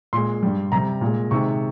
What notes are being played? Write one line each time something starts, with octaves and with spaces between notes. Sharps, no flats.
A#2 G#3 C6
G2 G3
C3 G3 A#5
A#2 G#3
C3 D#3 G#3 C#6